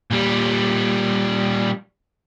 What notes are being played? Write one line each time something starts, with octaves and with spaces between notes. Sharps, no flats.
A#2 G3